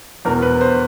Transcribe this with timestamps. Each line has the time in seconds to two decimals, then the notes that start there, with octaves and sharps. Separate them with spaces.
0.25 E2 B2 A#4
0.42 B4
0.61 C5